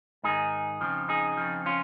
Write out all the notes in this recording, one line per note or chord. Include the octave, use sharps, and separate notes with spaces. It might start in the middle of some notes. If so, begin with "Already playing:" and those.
G#2 D#3 D#4 G#4
F2 C#3 F3
D#4 G#4
F2 C#3 F3
C#4 F4